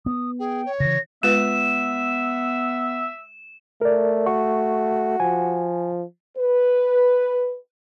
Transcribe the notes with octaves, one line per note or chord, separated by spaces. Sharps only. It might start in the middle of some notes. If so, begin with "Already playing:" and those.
B3 D#6
G#4 G5
C#5
C#3 E3 A#6
G#3 B3 F4 B4 E5 E7
A3 A#4 D5
F#4 C#6
F3 G#5
B4